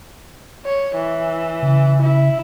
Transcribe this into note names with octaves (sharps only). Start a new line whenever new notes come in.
C#5
E3
C#3
E4